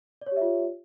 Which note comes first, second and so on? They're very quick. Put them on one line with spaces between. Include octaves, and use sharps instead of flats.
D5 C#5 G4 E5 F4